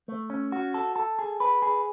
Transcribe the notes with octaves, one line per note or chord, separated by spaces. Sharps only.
A3
C#4
F#4
A4
A4
G#4
B4
G#4